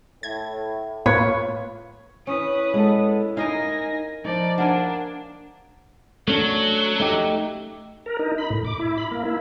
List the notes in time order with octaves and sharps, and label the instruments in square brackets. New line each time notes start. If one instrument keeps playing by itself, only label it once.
[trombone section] A2 [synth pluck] G#6
[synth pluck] A2 A#3 B4 [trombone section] F4 [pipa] C#5
[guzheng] C#4 [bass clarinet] E4 [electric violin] B4 D#6
[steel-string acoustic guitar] G#3 B3 A4
[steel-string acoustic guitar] D#4 [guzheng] A#4 D#5 F5 [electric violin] G#5 A#6
[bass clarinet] F3 [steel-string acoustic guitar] D#4 [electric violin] D5
[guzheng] A#3 A#4 G#5 [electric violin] D4 [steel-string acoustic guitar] F#5
[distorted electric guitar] F#3 [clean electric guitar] A3 C#4 D4
[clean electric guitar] A3 D#4 G4
[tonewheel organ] A#4
D#4
B5
A2
D6
E4
B5
A#3
E4